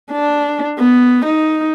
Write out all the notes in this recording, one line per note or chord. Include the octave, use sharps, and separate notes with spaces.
D4
B3
D#4